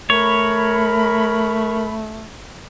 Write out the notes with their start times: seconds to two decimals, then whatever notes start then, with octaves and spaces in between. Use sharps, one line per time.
0.10 A3 A#4 C#5 B5